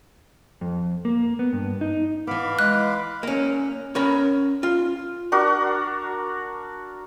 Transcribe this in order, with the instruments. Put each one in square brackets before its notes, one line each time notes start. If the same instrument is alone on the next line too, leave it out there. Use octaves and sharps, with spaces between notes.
[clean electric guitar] F2
A#3
B3
G2
D#4
[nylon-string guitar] E3 B3 [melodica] F5 B5 D6
[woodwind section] G#3 [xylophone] F#6
[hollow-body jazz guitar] A#3 C#4
C#4 A#4 B5
F4
[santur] D4 F#4 A#4